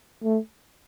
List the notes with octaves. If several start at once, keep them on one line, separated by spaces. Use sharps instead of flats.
A3